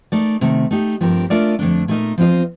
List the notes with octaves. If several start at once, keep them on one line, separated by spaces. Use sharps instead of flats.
A3 D#4 A#4 D5
C3 D#3 A3
A3 D#4 G4
G2 F3 C4 G4 A#4
A3 D4 F4 A#4 D5
F2 D3 A3 D4
A#2 A3 D#4 A#4 D#5
F3 C4 F4 C5 D#5